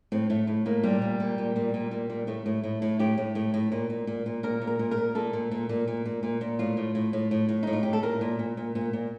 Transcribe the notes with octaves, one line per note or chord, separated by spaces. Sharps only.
A2 C4
A2 A3
A2
A2 A#3
A#2 G3
A#2
A#2
A#2
A#2
A#2
A#2
A#2
A2 A3
A2
A2
A2
A2 G4
A2
A2
A2
A#2
A#2
A#2
A#2
A#2 A#4
A#2
A#4
A#2
A#4
A#2
A#2 A4
A#2
A#2
A#2
A#2
A#2
A#2
A#2
A2 F4
A2
A2
A2
A2
A2
A2 D#4
F4
A2 G4
A4
A#2 A#4
A#2
A#2
A#2
A#2
A#2